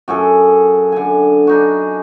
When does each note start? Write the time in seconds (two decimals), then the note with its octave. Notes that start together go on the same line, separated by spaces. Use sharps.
0.08 F#2 F#4 G#4 A4
0.92 D3 G#5
1.47 D4 D#4 F#4